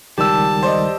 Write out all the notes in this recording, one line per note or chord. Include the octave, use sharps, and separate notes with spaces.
C#2 D#3 G3 G4 A5 E6
C5 D5 D#5